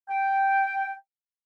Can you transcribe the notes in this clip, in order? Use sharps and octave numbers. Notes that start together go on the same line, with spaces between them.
G5